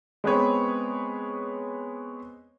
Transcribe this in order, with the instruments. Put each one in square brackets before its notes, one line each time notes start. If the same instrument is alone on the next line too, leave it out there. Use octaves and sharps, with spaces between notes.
[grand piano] G#3 B3 C4 G#4 B4 C#5